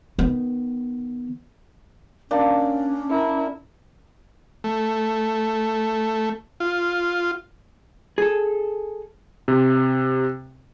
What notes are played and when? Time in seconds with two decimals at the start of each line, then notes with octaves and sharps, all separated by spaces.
0.19 D#3 B3
2.31 A#3 C#4 D4
3.10 E4 A#4
4.64 A3
6.60 F4
8.18 G#4 A4
9.48 C3